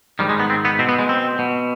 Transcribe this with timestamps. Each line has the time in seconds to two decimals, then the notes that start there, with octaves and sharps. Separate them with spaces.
0.19 G#2 D#3 G3
0.29 G#3
0.40 B3
0.50 C4
0.65 B3
0.79 B2 C4
0.89 B3
0.99 G#3
1.09 C4
1.39 B2